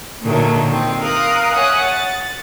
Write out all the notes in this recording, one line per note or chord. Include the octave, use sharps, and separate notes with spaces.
A#2 D3 D#3 F#3 A3
D#3 C4
A#4 F5 D#6 F#6
C#5 E5 F#5 G#5 D#6
A6